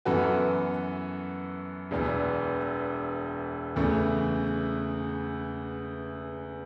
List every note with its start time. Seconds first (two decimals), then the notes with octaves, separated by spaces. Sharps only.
0.05 F#2 E3 B3 F#4 A4
1.91 E1 E2 E3
3.76 E2 C#3 E3 A3